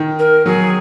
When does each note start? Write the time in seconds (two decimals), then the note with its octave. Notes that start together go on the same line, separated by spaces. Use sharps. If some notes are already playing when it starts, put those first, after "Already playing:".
Already playing: D#3
0.19 A#4
0.46 F#3 G#4